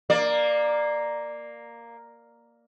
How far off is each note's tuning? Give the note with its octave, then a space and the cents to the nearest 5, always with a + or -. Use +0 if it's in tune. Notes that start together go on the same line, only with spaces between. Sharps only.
A#3 +0 D5 +20